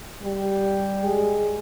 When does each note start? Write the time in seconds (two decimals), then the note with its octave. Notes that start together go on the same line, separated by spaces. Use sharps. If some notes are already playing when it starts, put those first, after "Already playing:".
0.22 G3
1.05 G#3